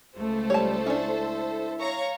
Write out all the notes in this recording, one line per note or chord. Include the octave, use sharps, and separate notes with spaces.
C#2 A3 A4 C5
G3 C#5 A5
C#4 D4 E4
C#5 F5 A#5 C#6